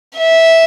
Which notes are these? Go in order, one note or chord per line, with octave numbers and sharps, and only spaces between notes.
E5